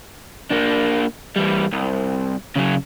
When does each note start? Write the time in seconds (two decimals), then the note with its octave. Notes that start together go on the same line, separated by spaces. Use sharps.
0.51 A#3 D4
1.36 E3 G3
1.72 C2
2.56 C#3 F#3